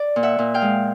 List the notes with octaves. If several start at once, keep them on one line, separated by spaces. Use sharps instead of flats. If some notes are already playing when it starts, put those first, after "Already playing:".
Already playing: D5
A#2
E5 F#5
A#2
F5 G5
G#3